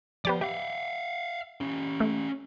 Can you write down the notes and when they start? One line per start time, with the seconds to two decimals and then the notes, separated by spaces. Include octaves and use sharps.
0.25 F3 B3 G4 D5
0.41 G4 E5 F5
1.61 C#4 G4
2.00 A3